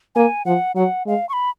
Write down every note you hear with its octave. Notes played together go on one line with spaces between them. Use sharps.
A#3 G#5
F3 F#5
F#3 F#5
G#3 F5
C#6
B5